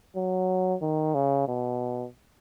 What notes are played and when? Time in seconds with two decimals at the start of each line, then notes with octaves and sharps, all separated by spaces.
0.16 F#3
0.82 D#3
1.15 C#3
1.48 B2